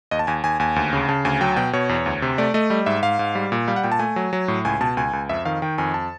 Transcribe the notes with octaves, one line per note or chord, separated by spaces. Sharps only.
D#2 D#5
A5
D#2 G#5
D#2 G#5
D#2 G#5
D2
C#3
C#3 A5
D2 G#5
F#3 G5
B2 G5
B2 C#5
E2
D2
C3
A3 D5
A3 D#5
G3 D#5
G#2 E5
G#2 F5
G#2
G3
A#2
G3 F5
F#5
A#2 G5
A5
A3 G#5
F#3
F#3
A2
C#2 G#5
B2 A5
C#2 G#5
C#2
F2 E5
D#3 F5
D#3 G5
F2 G#5
A5